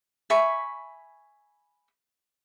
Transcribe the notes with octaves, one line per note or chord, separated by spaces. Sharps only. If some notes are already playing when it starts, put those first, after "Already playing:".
E5 G#5 B5 C#6